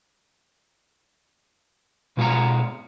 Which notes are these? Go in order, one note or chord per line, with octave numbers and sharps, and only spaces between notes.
B2 G#3 F4 G4 F#5 A#5